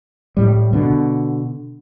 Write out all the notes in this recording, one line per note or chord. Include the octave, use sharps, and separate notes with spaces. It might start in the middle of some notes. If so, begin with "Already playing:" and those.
A2 G3
B2 D3